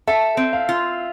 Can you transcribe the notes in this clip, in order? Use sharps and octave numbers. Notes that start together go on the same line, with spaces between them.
A4 E5
C4
F5
F4